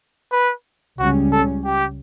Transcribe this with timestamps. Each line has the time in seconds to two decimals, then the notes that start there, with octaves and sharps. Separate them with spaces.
0.32 B4
0.99 C#2 C#3 G3 C#4 F#4
1.32 A4
1.65 G4